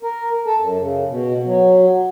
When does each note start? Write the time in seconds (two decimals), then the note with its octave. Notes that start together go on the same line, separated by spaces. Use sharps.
0.03 A#4
0.46 A4
0.60 F#2
0.79 C#3
1.09 B2
1.45 F#3